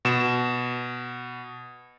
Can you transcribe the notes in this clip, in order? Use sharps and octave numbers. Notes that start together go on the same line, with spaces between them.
B2 E7